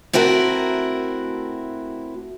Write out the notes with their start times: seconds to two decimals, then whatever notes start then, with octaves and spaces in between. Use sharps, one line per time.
0.13 A3 C4 E4 F#4 A#4